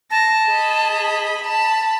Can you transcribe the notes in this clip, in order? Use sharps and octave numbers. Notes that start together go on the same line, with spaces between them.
A5 A#6
G#4 D#5 B5
A5 B5